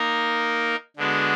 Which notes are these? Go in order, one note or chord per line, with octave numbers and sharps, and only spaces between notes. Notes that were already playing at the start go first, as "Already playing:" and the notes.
Already playing: A#3 D#4 A#4
D3 G#3 B3 D4 F#4